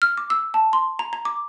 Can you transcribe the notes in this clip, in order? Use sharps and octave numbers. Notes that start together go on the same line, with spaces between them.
F6
D6
E6
A5
C6
A#5
A#5
D6